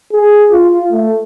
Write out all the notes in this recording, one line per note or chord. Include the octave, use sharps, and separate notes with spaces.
G#4
F4
A3